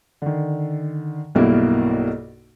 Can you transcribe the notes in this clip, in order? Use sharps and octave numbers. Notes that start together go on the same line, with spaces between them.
D3 D#3
B1 G2 B2 A#3 E4 A#4